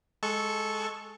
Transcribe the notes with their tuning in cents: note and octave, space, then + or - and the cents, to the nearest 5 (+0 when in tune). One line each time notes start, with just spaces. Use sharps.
G#3 +10 A4 -10 C#6 +0